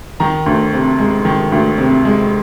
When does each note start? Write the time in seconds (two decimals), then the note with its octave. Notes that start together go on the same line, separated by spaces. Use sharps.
0.20 D#3 A#5
0.46 D2
0.73 C3
0.99 G#3
1.25 D#3
1.52 D2
1.78 C3
2.05 G#3